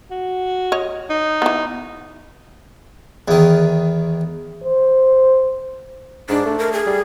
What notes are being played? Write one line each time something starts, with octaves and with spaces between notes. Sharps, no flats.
F#4
C#5 D#5
D#4
E3 B3
E2 D#3
C5
G#2 D4
A3
A#4
G#4
G3